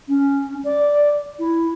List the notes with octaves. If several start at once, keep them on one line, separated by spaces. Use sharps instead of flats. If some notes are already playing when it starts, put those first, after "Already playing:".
C#4
D5
E4